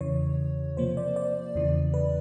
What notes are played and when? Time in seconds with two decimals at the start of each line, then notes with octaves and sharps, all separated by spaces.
0.01 E2 C#3 E3 C#5
0.77 C3 F3 A#3 C5
0.97 D5
1.16 D5
1.55 E2 C#3 E3
1.94 B4